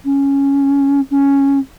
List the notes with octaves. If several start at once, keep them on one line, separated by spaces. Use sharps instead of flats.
C#4
C#4